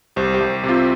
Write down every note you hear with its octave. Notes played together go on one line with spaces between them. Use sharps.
C2 G4 C5
G4 C5
C2
C3
C4 F4